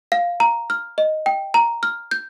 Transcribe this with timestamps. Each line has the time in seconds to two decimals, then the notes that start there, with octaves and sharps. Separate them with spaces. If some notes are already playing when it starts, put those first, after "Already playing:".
0.12 F5
0.40 A#5
0.70 F6
0.98 D#5
1.26 G5
1.54 A#5
1.83 F6
2.11 G6